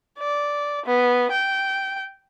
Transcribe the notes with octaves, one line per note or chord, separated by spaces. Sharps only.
D5
B3
G5